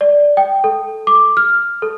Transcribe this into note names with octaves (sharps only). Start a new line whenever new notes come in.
D5
G5
A4
D6
F6
A4